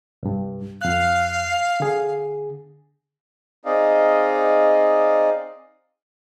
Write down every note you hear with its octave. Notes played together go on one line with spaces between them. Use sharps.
C2 G2
F2 F5 F#6
D3 G#4
C4 D#4 G#4 D5 D#5 F5